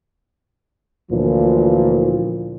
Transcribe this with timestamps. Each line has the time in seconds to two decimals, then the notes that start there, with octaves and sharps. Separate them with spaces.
1.11 D2 A#2 E3 F3